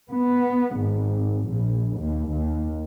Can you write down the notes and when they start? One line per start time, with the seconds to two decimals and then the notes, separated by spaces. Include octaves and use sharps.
0.11 B3
0.77 G#1
1.49 A#1
1.99 D#2
2.32 D#2